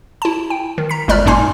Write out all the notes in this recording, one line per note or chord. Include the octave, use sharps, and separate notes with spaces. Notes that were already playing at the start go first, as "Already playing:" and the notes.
E4 A5
G5
D#3
A#5 B6
G1 G#3 D5 A#5 F6
F#2 A#2 A#3 D#4 G#5 C6